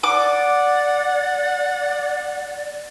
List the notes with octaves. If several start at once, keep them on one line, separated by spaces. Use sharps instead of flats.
D5 F#5 D6